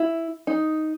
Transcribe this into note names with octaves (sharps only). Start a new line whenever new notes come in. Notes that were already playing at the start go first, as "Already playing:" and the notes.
Already playing: E4
D#4